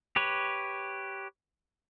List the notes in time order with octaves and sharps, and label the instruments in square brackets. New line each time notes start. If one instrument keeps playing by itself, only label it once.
[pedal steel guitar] G4 B4 C#5